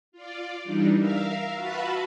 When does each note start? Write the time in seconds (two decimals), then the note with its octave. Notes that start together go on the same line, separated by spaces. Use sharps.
0.12 F4 D5
0.64 E3 G3 D4 D#4
0.97 A#4 E5 F5
1.54 F4 F#4 B4 E5 A5 B5